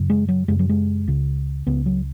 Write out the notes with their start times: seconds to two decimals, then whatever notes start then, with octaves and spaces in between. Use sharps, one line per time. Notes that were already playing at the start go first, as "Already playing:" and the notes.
Already playing: F#2 C#3
0.10 G#3
0.28 F#3
0.48 F#2 C#3 G#3
0.59 F#3
0.69 G#3
1.08 C#2 C#3
1.66 C#2 C#3 B3
1.86 F#3